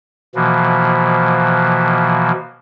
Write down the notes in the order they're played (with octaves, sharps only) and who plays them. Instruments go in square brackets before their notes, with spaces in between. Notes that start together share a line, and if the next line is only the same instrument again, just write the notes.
[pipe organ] B2 E3 F3 A#3